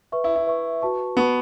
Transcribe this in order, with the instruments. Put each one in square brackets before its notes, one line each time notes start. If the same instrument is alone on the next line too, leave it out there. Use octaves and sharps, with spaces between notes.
[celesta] B4 E5 C#6
[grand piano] E4
E4
[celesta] B4 E5 C#6
F#4 B4 A5 C#6
[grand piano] B3 [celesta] F#4 B4 A5 C#6